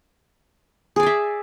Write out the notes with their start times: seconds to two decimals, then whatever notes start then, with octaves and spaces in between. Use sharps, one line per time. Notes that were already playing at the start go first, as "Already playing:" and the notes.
0.96 G#4
1.00 D5
1.03 G#5
1.06 E5